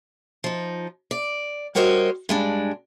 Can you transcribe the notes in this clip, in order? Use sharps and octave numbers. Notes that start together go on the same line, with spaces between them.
F3 D#4
D5
G3 F#4 A#4 C5 C#5 D#5
G2 G#3 D4